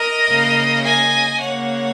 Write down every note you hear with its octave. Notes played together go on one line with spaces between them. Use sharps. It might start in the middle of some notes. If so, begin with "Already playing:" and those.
Already playing: A#4 D#5
C#3 A#3
D#5 G#5
C#3 A#3 C#5 F#5